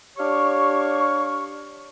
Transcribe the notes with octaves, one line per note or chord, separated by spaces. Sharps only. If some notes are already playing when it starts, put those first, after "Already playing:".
D4 G4 C#5 F5 C#6